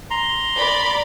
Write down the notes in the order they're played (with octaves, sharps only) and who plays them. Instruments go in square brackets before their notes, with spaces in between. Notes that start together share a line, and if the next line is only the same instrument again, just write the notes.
[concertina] A#5 C6
[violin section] D5 B5